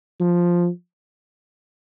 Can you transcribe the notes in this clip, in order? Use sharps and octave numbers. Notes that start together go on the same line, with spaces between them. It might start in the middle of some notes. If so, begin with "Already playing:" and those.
F3